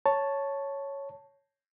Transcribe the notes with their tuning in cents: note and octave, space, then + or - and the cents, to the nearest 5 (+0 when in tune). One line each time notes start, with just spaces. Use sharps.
C#5 +0 A5 +0